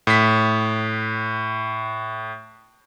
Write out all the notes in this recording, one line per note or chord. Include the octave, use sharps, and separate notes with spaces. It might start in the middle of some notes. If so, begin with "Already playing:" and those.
A2 B6